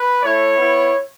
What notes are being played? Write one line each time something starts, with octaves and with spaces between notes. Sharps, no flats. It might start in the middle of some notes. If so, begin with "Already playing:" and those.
Already playing: B4
A3 E4 C#5
B3 E4